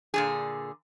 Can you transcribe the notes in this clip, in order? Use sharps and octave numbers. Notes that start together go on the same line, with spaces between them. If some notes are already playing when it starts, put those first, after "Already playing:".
A#2 D3 G#4